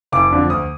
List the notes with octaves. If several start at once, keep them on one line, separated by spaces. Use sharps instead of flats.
F#1 D6
F2 D3 F3
D2 D#6